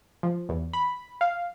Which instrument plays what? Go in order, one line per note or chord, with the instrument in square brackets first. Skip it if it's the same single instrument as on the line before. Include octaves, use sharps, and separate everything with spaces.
[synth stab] F3
E2
B5
F5